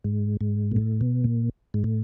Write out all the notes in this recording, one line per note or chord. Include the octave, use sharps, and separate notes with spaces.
G#2
G#2
A#2
A2
B2
A#2
G#2
A2